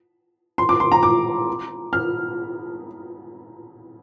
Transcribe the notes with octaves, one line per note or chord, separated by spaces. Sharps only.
C6
D6
C6
A#5
D6
F6